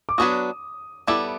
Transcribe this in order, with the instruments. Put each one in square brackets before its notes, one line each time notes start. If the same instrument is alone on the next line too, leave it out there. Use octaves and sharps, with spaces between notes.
[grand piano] D6
[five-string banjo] F#3 B3 D4 F#4 [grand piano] D#6
[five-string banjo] G3 B3 E4 A4 [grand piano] D6